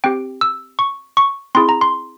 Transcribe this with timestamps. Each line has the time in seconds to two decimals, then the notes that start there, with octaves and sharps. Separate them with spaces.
0.04 C4 G4 G5
0.41 E6
0.79 C#6
1.17 C#6
1.55 C4 E4 G#4 C6
1.69 A#5
1.81 C6